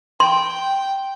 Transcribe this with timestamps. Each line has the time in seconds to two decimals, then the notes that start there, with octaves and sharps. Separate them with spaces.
0.20 G5 C6